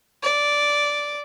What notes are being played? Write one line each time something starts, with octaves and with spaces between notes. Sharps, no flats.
D5